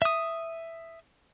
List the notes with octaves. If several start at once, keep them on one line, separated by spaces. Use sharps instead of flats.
E5 D#6